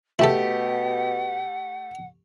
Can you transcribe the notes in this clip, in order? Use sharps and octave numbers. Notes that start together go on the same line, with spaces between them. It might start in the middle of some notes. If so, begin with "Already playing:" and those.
B2 A3 E4 G4 A4 F#5